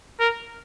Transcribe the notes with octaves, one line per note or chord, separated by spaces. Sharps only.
A#4